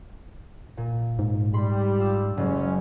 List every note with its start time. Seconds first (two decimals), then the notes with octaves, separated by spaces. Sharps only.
0.77 A#2
1.19 G#2
1.54 G3 B5 C6
2.00 F4 E6
2.37 F#1 G#3 C#4